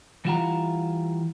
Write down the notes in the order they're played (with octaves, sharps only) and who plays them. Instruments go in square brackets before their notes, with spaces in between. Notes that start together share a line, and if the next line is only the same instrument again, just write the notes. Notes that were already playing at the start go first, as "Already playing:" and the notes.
[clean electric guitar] E3 G3 E4 F4 F#5 A#5